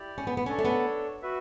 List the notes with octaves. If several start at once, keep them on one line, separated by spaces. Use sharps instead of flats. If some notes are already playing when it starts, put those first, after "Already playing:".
Already playing: E4 G4 D5
C#4
B3
B3
C#4 D4 A4 C#5
A3
B3
F#4 B4 E5